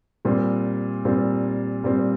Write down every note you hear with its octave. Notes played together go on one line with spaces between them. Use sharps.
A#2 G3 C4
A#2 G3 C4
A#2 G3 C4